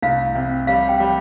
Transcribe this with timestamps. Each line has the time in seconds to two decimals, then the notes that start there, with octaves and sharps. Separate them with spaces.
0.02 C2 F5
0.35 C3
0.67 G3 F5
0.89 G5
1.00 G3